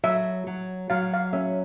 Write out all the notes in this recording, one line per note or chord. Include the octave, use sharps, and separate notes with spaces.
F#3 E5
F#3
F#3 F5
F5
C#4 E5